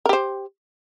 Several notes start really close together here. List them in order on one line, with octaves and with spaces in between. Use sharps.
A#4 G4 C5